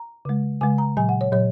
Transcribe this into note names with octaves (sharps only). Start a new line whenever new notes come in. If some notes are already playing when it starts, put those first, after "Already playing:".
Already playing: A#5
C#3 G#3
C#3 G#3 G#5
A#5
A#2 F#3 G#5
F#5
C#5
A#2 F#3 C#5